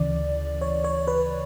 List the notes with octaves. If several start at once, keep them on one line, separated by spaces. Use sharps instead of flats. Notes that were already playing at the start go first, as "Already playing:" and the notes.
Already playing: D2 C#3 E3 D5
C#5
C#5
B4